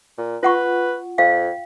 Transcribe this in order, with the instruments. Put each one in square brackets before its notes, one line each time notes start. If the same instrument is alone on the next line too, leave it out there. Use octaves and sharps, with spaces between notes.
[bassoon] A#2
[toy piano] F4 F#5 C#6 [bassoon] B4
[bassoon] F2 [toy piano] F5 G5